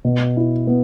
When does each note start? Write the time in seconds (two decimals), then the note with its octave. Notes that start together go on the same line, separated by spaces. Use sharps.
0.05 B2
0.37 E4
0.67 B3